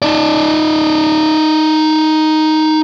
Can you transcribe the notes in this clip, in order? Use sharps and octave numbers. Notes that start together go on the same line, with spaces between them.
D#4 D5